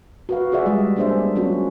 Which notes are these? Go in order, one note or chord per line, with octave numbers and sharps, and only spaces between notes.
F#4 B4 F5
F4 G#4 D5 E5 F#5
G3 G#3 D#5
G3 A#3 D4 G#4 C5 E5
A#3 B3
F#3 A#3 B3 C#4 F4 F#4